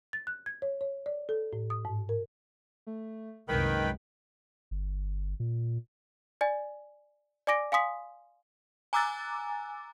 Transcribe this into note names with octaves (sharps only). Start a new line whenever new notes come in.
A6
F#6
G#6
C#5
C#5
D5
A4
A2
D#6
G#2
A#4
A3
C2 F#2 A#2 D#3 G#3 B4 G5 B5
G1
A#2
D5 G#5 A6
D5 G#5 D6 A#6 D7
F5 G#5 C6 D#6 B6
G#5 A#5 D6 E6 F#6 A6